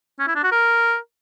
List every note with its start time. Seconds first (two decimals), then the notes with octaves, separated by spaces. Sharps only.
0.19 C#4
0.28 E4
0.36 D4
0.44 F#4
0.52 A#4